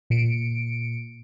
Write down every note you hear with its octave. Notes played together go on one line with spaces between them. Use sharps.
A#2 C#7 D7